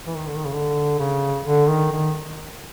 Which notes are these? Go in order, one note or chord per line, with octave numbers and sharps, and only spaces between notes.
E3
D#3
D3
D#3
C#3
D3
C#3
D3
D#3
D#3